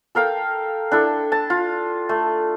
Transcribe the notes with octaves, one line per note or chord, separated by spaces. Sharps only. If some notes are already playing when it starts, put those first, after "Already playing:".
A4 A#4 F5 G5
D4 E4 A4
A5
F4
A3